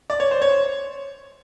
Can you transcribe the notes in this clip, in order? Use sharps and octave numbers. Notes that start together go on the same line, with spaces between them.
D5
C#5
C5
C#5